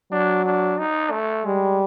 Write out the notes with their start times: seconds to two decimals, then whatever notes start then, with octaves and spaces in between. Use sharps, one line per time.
0.11 F#3 D4
0.45 D4
0.79 D#4
1.11 A3
1.45 G3 G#3